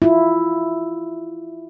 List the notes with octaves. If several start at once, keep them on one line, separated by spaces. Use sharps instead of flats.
E4 F4